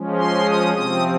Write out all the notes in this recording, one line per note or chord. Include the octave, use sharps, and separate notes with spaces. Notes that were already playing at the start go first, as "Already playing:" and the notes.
Already playing: F3 G#3 C#4
C6
D#6
C3 F3 C4 D#6